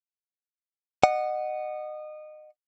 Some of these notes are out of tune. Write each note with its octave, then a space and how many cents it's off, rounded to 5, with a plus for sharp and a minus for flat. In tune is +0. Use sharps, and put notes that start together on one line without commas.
D#5 -25 F#5 +0